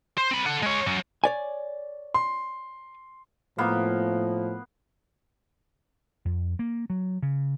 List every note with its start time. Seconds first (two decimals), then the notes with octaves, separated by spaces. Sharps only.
0.18 C5
0.31 C4 B5
0.46 A4 F#5
0.63 G#3 C#5
0.87 F#3 C#4
1.24 C#5 D5 G#5
2.14 C6
3.58 A2 F3 A#3 B3
6.25 F2
6.59 A#3
6.90 F#3
7.23 C#3